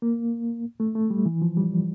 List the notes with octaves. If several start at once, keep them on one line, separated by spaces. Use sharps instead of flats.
A#3
A3
A3
G3
E3
F3
G3